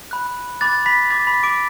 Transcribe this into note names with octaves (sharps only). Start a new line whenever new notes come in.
B5 F#6
B5 D6 F#6 A6
B5 B6
B5 D6 F#6 A6
B5 B6
D6 D7